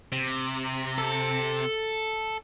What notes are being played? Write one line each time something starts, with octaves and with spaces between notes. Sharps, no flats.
C3
A4